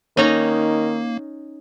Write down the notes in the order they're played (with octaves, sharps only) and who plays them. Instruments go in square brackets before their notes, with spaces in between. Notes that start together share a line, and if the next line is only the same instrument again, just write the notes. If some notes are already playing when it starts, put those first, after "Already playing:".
[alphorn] D#3 [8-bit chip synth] A#3 [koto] C#4 D#4 A#5